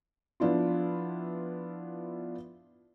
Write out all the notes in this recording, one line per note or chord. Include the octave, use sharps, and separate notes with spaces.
F3 B3 D4 E4 F4